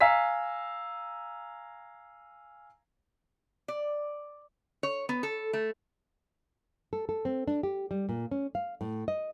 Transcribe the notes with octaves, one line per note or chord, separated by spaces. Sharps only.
F5 G#5 A#5 E6 B6
D5
C#5
B3
A4
A3
A4
A4
C4
D4
G4
G3
A#2
C#4
F5
A2
D#5